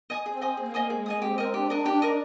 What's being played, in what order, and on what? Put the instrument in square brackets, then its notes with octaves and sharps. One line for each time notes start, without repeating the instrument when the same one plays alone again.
[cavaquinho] D#5 G#5 D#6
[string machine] C4 [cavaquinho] G#4
[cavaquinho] D#5 G#5 D#6
[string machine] A#3 [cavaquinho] G#4
[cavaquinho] D#5 G#5 D#6
[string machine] G#3 [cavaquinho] G#4
[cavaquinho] D#5 G#5 D#6
[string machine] C4 [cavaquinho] G4
[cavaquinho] A#4 D#5
[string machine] D4 [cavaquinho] G4
[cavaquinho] A#4 D#5
G4
A#4 D#5